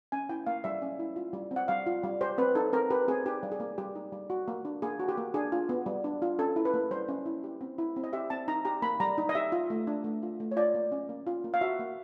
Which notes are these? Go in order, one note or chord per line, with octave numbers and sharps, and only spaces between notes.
C#4 G#5
E4 G5
A#3 F5
G3 E5
C#4
E4
F4
G3
C4
F#5
G3 F5
F4
G3
G4 C5
C4 B4
D#4 A4
C4 A#4
G4 B4
C4 G#4
D#4 G4
G3
G#4
A#3
G3 G4
D#4
G3
F#4
A#3
D4
A#3 G#4
F#4
G4
A#3
D4 G#4
F4
B3
G3
D4
F4
C#4 A4
E4
B4
A#3
G3 C5
C#4
E4
G4
C4
E4
C4
D#5
G4 E5
C4 A5
D#4 A#5
G4 A#5
A#3 B5
G3 A#5
D#4
D#5
G4 E5
F4
A3
D4
A3
F4
A3
C#5
F4 D5
A#3
C#4
A#3
F4
A#3
F5
F#4 E5
A#3